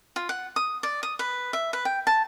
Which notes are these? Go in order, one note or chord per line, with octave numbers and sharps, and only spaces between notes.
F4
F#5
D#6
D5
D#6
B4
E5
B4
G5
A5